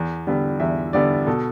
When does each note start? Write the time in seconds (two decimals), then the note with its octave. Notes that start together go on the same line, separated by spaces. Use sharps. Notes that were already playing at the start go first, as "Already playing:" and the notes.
Already playing: E2
0.27 D3 G3 B3
0.60 E2 E5
0.93 D3 G3 B3 D5
1.27 B2 A4